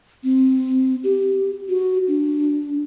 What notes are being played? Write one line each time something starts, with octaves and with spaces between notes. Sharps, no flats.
C4
G4
F#4
D4